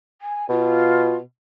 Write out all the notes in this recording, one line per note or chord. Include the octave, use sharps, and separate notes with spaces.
G#5
B2 F4